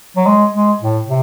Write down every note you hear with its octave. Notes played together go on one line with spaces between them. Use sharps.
F#3
G#3
G#3
A2
C3